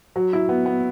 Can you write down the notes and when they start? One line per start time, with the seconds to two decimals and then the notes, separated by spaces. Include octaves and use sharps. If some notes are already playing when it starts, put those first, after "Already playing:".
0.16 F#3
0.33 E4
0.49 B3
0.66 B3